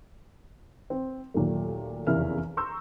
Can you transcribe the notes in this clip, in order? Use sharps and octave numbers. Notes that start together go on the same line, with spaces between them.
C4
D#2 A#2 F#3 A3
F1 E2 C#3 E4 A#4 F6
A#5 C6 C#6 E6 G6